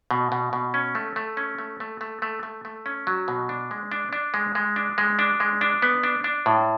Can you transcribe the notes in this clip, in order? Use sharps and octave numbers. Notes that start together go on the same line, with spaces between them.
B2
B2
B2
C#4
A3
A3
C#4
A3
A3
A3
A3
A3
A3
C#4
F#3
B2
D4
G#3
D4
D4
G#3
G#3
D4
G#3
D4
G#3
D4
B3
D4
D4
A2